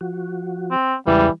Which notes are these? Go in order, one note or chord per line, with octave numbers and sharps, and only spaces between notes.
F3 F#4
C4
E2 C#3 E3 G3 G#3